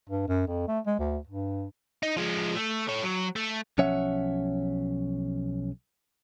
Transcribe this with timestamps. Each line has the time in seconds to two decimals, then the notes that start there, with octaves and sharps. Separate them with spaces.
0.09 G2
0.28 F#2
0.47 F2
0.67 A3
0.86 G#3
0.99 D2
1.27 G2
2.03 D#4
2.17 F3 G#3
2.56 A3
2.87 A4 C#5
3.03 F#3
3.36 A3
3.78 B1 F3 C#4 C#5 E5 F#5